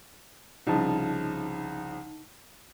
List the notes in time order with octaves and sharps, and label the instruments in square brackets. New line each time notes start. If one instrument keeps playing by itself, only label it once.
[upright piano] C2 C#3 F3 [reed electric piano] D#4 A5